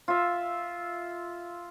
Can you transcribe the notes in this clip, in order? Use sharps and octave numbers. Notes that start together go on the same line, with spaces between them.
F4 E5